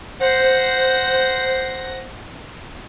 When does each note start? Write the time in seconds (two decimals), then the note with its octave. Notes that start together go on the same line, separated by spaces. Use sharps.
0.21 C5 F#5 A#6